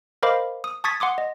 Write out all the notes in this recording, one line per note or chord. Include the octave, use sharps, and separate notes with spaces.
A#4 C5 D#5 F5 B5 D6
D#6
A5 C#6 D#6 G#6 A6 B6
F#5 C6 D6 D#6
D#5